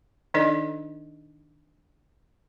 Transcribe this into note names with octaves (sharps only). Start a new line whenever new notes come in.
D#3 D4 D#4 A4 D5 D#5